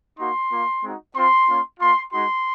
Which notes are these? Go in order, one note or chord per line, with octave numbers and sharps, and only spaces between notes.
A#3 D#4 F#4 C6
A#3 F4
G#3 C4 D#4 F#4
C4 F4 C6
A#3 C#4 F4
A#3 F4 C6
G#3 D#4 F#4 C6